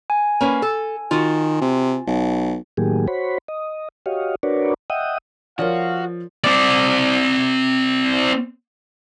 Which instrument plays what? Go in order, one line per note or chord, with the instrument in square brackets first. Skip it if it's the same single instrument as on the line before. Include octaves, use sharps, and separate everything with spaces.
[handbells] G#5
[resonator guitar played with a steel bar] A#3 C#4 B4
A4
[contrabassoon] D#3 [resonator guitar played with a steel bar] F4 F#4
[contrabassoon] C3
B1
[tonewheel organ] A2 D#3 F#3 A#3 G4 G#4
F#4 C5 C#5 B5
D#5
F#4 G4 C#5 D#5 F5
D4 F#4 A#4 B4 C#5 D5
D#5 E5 F#5 G5 D#6
[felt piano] F3 [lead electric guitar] F#4 [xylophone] A#4 C#5 D5 [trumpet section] F5
[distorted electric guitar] C4 D5